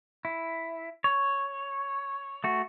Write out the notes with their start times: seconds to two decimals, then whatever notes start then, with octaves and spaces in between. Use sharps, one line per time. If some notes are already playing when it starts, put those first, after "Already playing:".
0.25 E4
1.04 C#5
2.44 A3 F#4